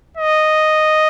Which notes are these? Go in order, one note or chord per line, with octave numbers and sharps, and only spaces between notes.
D#5